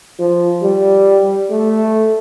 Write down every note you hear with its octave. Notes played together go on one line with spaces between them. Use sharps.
F3
G3
A3